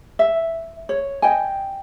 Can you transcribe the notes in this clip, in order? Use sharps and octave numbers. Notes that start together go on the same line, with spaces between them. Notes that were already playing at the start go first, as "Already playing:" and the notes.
E5
C#5
D#5 G5 G#5